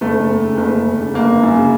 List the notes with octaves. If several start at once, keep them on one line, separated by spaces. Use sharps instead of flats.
F#1 A3
F#1
E2
C#3
F#1
F#1
E2
C#3
G1 A#3
G1
F#2
C#3